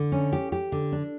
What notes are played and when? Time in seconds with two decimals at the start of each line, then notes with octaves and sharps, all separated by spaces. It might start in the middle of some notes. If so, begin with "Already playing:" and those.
Already playing: D3
0.12 C#4
0.33 G4
0.52 G4
0.72 D3
0.92 D4